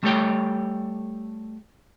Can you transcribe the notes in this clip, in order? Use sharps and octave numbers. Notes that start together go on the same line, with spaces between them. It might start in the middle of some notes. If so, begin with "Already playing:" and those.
G3 A3 G4 A4 C#5 G5